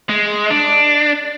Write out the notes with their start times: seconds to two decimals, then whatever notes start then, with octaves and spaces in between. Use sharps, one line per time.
0.09 G#3
0.50 D4